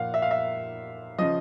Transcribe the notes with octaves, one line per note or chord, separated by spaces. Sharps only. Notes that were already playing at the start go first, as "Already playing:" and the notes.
Already playing: A#2 F3 A#3 F5 F#5
E5
F5
E5
C#3 F3 D#5